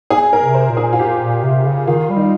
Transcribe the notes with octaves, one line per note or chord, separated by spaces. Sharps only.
G#4
A#4
C3
C5
A#2
G#4
F4
G4
A#2
C3
C#3
D#3 F4
G3
D#4